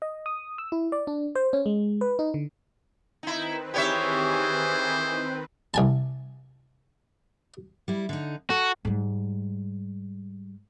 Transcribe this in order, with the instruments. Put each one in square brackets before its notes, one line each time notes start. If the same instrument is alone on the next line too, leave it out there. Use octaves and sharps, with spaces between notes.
[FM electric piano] D#5
D#6
E6
E4
D5
D4
C5
C#4
G#3
B4
D#4
D3
[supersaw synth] D#3 C4 B4 [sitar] D#4 E4
[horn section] E3 G#4 [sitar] G4 C#5 E5 [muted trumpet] C5
[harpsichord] C2 G#5 A5
[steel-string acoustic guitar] G3 E4
D3 D#4
[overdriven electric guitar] F#4 [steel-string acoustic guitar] A4
[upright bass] G#2 G3